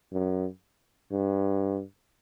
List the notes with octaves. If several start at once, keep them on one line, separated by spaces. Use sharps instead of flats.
F#2
G2